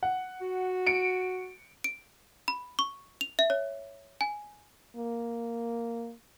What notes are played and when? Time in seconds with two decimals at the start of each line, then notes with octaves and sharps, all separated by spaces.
0.03 F#5
0.41 F#4
0.87 C#7 D7
1.84 D7
2.48 B5
2.79 C#6
3.21 F7
3.39 E5
3.50 C#5
4.21 G#5
4.96 A#3